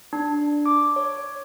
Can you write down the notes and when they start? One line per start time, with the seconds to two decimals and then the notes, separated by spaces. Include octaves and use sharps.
0.13 D4
0.66 D6
0.96 C#5